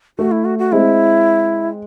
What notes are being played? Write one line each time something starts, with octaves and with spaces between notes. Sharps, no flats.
A3 F#4
E4
F#4
F#4
G#3 C4 E4